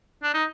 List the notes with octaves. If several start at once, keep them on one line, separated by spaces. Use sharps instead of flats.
D4
D#4